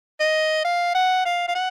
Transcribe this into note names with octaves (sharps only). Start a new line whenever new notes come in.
D#5
F5
F#5
F5
F5
F#5